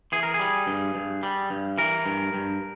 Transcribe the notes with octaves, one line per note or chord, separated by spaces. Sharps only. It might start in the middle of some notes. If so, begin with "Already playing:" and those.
E3 G#4
A#4
G#4
G3
G2
G2
G3
G2
E3 A#4
G2
G2